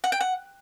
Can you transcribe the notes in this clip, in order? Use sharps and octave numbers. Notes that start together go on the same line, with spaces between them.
F#5
G5
F#5